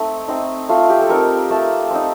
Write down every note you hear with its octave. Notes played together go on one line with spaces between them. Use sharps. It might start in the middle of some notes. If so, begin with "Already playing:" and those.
Already playing: A3 C4 D#4
C4 D#4
A3 F4
G4
A4
C4 D#4 A#4
A3 A5
C4 D#4